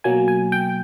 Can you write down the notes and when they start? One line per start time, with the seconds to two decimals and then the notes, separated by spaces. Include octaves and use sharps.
0.04 B2 F#3 A#3 G#5
0.28 G#5
0.52 G5